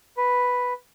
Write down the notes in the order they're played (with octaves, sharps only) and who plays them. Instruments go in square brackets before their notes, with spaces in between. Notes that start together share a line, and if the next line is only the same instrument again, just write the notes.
[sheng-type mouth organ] B4